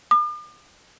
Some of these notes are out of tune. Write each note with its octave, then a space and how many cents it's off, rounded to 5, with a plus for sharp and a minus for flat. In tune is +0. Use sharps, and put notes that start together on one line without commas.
D6 +45